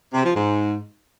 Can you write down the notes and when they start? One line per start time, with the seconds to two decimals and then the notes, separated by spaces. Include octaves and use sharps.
0.14 C3
0.25 F3
0.35 G#2